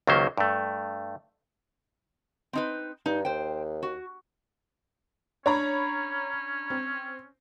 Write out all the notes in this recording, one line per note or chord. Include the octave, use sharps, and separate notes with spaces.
C#2 D#3 F#3 A#3 C#4 C5
G2 A3
C4 D#4 B4
G2 D#4
D#2 C5 G5
F#4
C#4 D4 C#5 A#5 B5
C4